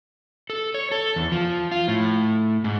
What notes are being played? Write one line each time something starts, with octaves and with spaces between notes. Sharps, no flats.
A4
C#5
A4
E2
F3
F4
A2
G#2